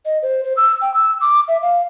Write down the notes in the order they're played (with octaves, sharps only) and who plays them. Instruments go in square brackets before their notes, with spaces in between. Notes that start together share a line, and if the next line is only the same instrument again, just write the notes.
[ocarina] D#5
C5
C5
E6
G5
E6
D6
E5
F5